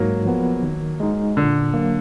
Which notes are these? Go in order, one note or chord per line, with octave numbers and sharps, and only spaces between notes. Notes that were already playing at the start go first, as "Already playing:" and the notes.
Already playing: G#2 F#3 A#3
F3 B3
D#3
G#3 D#4
A#2 D3
F#3 A#3